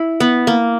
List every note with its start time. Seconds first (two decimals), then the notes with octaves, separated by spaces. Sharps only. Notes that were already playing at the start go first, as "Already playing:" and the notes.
Already playing: E4
0.20 B3
0.47 A#3